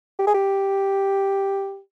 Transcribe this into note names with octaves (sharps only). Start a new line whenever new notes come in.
G4
G#4
G4